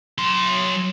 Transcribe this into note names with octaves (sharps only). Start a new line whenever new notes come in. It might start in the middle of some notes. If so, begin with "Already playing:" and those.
F#3 C6